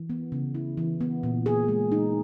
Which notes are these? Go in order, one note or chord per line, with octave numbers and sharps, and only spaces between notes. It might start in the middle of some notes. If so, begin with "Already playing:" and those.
Already playing: E3
B3
C#3
E4
E3
B3
A#2
G#4
G#3
D#4